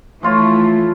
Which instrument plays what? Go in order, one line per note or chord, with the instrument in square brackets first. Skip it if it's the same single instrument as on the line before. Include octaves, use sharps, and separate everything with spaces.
[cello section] E3 A3 [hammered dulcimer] F3 F4 C#5